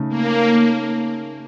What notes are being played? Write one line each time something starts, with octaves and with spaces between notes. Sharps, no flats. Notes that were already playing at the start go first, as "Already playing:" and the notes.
Already playing: C#3 A3 D#4
A#3